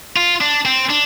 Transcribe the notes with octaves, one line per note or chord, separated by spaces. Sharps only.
F4
D4
C4
D4